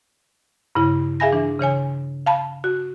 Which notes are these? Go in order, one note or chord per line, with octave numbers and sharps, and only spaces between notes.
G2 C#3 E4
G#4 E5 F5 G#5 B5 A#6
E3 D4
C#3 E3 C#5 G#5
F5 A5 B5
F#4